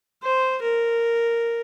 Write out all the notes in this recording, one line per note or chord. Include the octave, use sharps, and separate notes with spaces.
C5
A#4